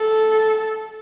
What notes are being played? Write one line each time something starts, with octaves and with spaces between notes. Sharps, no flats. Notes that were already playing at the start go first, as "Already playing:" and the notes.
Already playing: A4